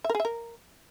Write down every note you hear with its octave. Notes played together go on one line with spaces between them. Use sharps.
E5
A#4
G#4
E5
A#4